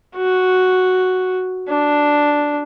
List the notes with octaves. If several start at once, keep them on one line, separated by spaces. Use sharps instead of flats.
F#4
D4